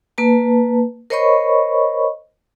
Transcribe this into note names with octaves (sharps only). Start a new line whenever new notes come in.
A#3 B4 A5
A#4 C5 C#5 D#5 B5 C#6